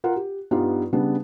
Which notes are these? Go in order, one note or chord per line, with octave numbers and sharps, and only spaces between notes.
F4 A#4 F#5
G4
G2 G3 B3 D#4 F4
C#3 G3 B3 D4